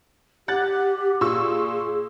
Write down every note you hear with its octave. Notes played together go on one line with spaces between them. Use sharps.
G4 F#5 F#6 A6
A#2 G#4 C#6 E6